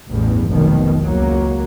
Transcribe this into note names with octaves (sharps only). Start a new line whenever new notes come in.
A1 E2 G2
F1 B1 B2 D#3
C#2 F#3 A#3